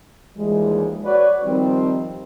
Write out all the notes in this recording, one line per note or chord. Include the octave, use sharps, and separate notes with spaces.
D#2 E3 F3 G3 G#3
F#4 B4 C#5 D5
D#3 F3 G3 C4